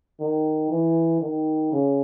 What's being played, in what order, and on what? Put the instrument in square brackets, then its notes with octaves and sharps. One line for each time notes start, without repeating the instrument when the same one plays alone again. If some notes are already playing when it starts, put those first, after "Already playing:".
[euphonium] D#3
E3
D#3
C#3